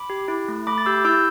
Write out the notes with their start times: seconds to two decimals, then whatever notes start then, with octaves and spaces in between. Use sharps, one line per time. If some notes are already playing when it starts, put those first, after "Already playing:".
Already playing: B5 D6
0.10 G4
0.28 E4
0.48 A3
0.67 A3 B5 D6
0.78 A6
0.86 G4 E6 G6
1.05 E4 E6 G6